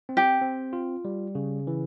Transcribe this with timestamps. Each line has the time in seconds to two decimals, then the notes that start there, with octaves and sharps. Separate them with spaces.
0.09 C4
0.17 G4
0.41 C4
0.73 F4
1.05 G3
1.35 C#3
1.67 E3